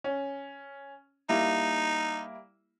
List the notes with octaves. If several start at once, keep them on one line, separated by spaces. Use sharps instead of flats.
C#4
G3 A#3 D#4 E4